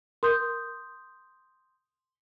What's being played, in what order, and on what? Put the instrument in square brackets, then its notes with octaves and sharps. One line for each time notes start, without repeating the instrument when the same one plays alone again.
[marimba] A#4 [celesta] C6 D#6 G6